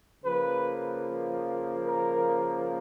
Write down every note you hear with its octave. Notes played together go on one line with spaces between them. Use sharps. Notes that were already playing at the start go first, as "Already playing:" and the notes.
C#3 F3 A#3 B4
A#4